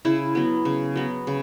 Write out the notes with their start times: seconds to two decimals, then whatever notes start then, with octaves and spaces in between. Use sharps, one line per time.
0.05 C#3 E4
0.35 F#3 B3
0.65 C#3
0.96 F#3 B3
1.27 C#3